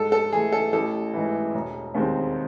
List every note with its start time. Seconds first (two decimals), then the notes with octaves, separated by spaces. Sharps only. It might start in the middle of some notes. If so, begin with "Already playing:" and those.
Already playing: G#2 A4
0.12 A4
0.32 E3 A3 G#4
0.52 A4
0.73 A1 A4
1.14 G#2 E3
1.54 E1
1.95 D#2 D#3 G#3 C4